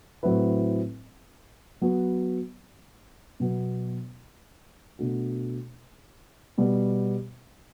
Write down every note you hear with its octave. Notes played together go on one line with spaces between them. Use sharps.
A2 F#3 C4 E4 B4
F#3 B3 F#4
B2 F#3 B3
B2 A3 D4 F#4
B2 G3 B3